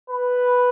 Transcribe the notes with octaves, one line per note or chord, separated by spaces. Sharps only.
B4